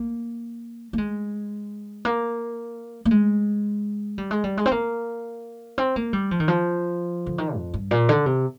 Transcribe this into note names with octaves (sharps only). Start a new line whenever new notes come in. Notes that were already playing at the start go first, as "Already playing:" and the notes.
Already playing: A#3
A#3
G#3
A#3
A#3
G#3
G3
G#3
G3
G#3
C4
A#3
C4
A#3
G3
F3
D#3
F3
D3
D#3
F2
G2
A#2
D3
C3